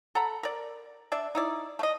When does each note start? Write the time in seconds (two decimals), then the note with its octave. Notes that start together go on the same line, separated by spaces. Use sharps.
0.15 A4 F#5 A#5 B5
0.43 A#4 D5
1.12 D4 D5 E5
1.35 D#4 E4 D5
1.79 A3 D#5